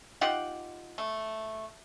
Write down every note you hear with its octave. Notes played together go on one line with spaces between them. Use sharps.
D#4 F4 G4 F#5
A3